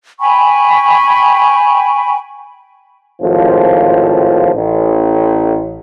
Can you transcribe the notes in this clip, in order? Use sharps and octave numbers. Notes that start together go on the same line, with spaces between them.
G5 G#5 B5 C#6
G#1 A2 F3
A1